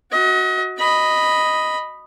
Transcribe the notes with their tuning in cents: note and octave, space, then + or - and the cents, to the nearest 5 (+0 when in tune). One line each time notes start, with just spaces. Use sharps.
F#4 +0 D#5 +35
D#5 +0 B5 +0